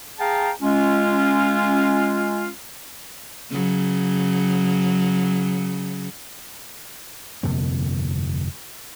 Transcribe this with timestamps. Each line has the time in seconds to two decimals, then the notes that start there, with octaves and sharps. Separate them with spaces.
0.19 G#4 F5 G5 A5 A#5
0.62 G#3 C#4 F4
3.52 C#3 F#3
7.43 G1 F2 C3 A#3